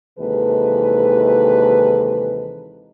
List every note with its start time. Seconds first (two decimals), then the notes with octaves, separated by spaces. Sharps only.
0.19 D#2 C3 E3 G#3 A4 B4